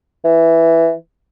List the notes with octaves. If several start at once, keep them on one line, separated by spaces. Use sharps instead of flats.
E3